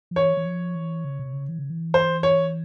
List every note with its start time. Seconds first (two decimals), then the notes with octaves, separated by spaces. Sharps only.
0.11 F3
0.16 E3 C#5
0.37 E3
0.45 F3
0.75 E3
1.05 C#3
1.19 C3
1.33 C#3
1.49 E3
1.59 C#3
1.70 E3
1.94 C5
2.23 C#5